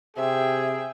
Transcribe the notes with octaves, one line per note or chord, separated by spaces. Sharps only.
C3 G#4 E5 G5